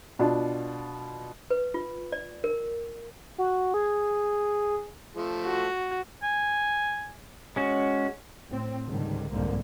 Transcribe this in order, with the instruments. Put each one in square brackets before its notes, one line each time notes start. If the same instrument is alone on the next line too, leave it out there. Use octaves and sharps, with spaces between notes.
[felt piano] B2 D4 F4
[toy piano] B4
F4
D5
A#4
[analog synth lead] F#4
G#4
[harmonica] F3 A3
[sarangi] F#4
[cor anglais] G#5
[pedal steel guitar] G#3 C#4 F#4
[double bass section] A2 C4
C#2 G#2 D3 D#3 G3
C2 F2 G#2 D3 A#3